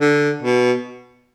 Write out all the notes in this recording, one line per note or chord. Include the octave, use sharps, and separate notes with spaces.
D3
B2